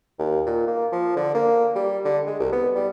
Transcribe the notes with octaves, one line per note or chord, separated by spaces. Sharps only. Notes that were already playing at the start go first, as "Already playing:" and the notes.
D#2
A#2
A#3
F3
D3
A#3
G3
D3
G#3
C2
B3
G3